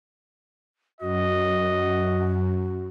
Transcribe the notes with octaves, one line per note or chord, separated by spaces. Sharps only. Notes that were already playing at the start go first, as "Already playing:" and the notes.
F#2 F#4 D#5